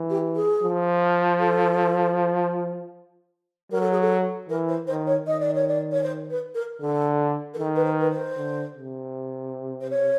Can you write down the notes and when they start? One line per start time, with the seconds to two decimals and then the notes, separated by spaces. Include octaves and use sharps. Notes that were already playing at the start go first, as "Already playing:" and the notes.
Already playing: E3
0.10 G4
0.36 G#4
0.63 F3
1.39 A4
3.72 F#3 A#4
3.81 A4
3.92 G#4
4.01 A4
4.49 E3 A#4
4.68 C5
4.87 D#3 C5
5.07 C#5
5.26 D#3 D#5
5.40 D5
5.55 C#5
5.68 D5
5.92 C#5
6.03 C5
6.30 B4
6.55 A#4
6.81 D3 A4
7.54 A#4
7.58 D#3 A4
7.76 B4
7.84 C5
8.00 B4
8.10 C5
8.37 D3
8.75 C3
9.81 C5
9.90 C#5